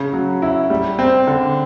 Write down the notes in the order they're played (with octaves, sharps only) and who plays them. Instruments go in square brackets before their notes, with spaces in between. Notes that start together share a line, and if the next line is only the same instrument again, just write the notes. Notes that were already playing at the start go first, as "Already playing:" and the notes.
Already playing: [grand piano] C#3
F#3
E4
G3
C4
D3